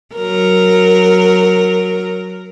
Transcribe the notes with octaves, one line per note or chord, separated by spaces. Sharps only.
F#3 A#4